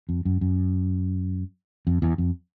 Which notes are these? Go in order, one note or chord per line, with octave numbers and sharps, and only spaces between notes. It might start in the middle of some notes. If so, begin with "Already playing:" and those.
F2
F#2
F#2
F2
E2
F2